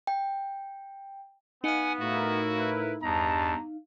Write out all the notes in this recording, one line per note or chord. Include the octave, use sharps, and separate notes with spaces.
G5
B3 D#4 F5 F#5 G#5
A2 E4 F#4 A#4
B4
E2 G2 D#5 A5 A#5